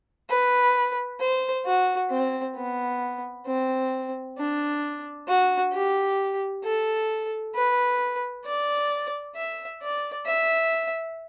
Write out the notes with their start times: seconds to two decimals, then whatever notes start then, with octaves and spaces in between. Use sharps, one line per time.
0.30 B4
1.20 C5
1.66 F#4
2.11 C4
2.56 B3
3.47 C4
4.38 D4
5.28 F#4
5.73 G4
6.64 A4
7.55 B4
8.46 D5
9.36 E5
9.82 D5
10.26 E5